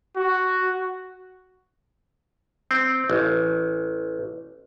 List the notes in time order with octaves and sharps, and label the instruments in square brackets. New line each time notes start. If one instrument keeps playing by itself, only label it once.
[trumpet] F#4
[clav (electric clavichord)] C4
A1